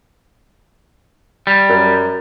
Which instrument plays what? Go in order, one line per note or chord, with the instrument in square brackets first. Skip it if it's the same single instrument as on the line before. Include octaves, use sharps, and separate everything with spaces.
[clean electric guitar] G3
[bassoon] F#2